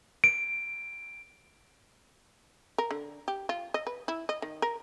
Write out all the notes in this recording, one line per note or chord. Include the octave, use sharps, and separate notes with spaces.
D7
A#4
D3
G4
F4
D#5
B4
E4
D#5
D#3
A#4